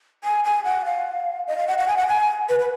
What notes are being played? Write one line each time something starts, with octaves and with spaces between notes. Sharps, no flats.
G#5
G#5
F#5
F5
D#5
F5
F#5
F#5
G#5
F#5
G#5
B4
B4